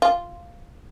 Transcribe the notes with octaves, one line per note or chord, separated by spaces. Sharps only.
F4